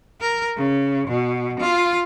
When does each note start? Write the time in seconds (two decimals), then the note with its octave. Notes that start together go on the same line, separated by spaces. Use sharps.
0.20 A#4
0.56 C#3
1.07 B2
1.59 F4